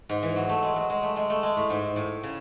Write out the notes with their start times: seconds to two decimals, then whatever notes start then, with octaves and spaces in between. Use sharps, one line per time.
0.09 G#2
0.23 E3
0.36 F#3
0.49 A3
0.63 G#3
0.76 F#3
0.90 G#3
1.03 A3
1.16 G#3
1.30 A3
1.43 G#3
1.57 A2
1.70 G#2
1.96 A2
2.23 C#3